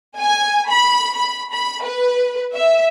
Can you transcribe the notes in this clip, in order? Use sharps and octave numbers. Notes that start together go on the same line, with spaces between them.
G#5
B5
B5
B5
B4
E5